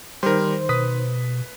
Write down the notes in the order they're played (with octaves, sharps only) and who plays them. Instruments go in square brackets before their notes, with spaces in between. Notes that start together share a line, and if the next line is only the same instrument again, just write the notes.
[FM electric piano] D#3 C5 [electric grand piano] G3 A#4
[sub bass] B2 [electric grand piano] B4 D#6 B6